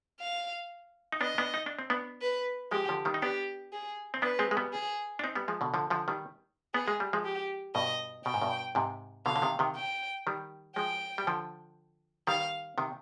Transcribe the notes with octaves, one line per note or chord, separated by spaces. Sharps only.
F5
D#4
B3 D4 D#5
B3 D4
D#4
D4
C4
B3 D4
B4
F3 G#3 G4
D3 F3
D#3 G3
D#4
B3 D4 G4
G#4
C4
B3 D4 B4
G#3 C4
G#3
G3 B3
G#4
D4
C4 D#4
G3 B3
F3 G#3
B2 D3
D3 F3
D3 F3
D#3 G3
B3 G#4
G#3
G3
F3 G#3
G4
G2 B2 D#5
B2 G5
G#2
G2 B2
G#2 C3
B2 D3 F5
D3
C3 D#3
C3 D#3
G5
D#3 G3
F3 G#3 G5
G3
D3 F3
D#3 G3 F5
C3 D#3